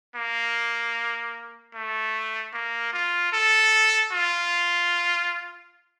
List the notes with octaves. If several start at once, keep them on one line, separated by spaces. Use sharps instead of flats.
A#3
A3
A#3
F4
A4
F4